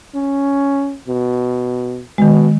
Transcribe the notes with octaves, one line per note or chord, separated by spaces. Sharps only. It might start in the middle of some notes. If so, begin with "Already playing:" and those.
C#4
B2
B2 D#3 G#3